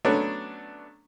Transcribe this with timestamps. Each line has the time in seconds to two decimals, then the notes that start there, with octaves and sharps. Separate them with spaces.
0.05 F#3 A3 B3 C#4 D4